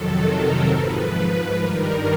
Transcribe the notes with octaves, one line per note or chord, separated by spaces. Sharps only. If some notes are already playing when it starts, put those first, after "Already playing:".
Already playing: F2 C3 D#3 F#3 A4
A#4
G#2 F3 B4
B4
G2 D#3 G3 A#4